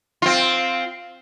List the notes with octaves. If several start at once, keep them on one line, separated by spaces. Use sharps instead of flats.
C4 F4